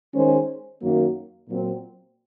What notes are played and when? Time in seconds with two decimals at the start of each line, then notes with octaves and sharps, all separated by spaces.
0.14 D#3 G#3 C#4 G#4 C5
0.82 F#2 D#3 F#3 A#3
1.48 A#2 F#3 C4